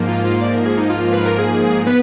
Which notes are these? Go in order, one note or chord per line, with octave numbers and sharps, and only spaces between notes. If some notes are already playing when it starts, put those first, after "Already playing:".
Already playing: G#2 F3 A#3
F4
F4
D5
A#4
G#4
D#4
F4
B4
A#4
G#4
B3 B4